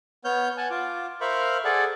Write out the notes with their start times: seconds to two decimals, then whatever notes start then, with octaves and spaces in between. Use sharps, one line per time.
0.25 B3 C#5 F6 G6
0.57 F#5 G#5 A5
0.70 F4 D6
1.21 A#4 C5 E5 F5 B5 C#6
1.65 G#4 A4 D5 F#5